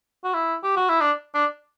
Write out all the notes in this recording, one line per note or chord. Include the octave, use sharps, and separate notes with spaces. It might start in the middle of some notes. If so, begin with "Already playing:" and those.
F#4
E4
G4
F#4
E4
D4
D4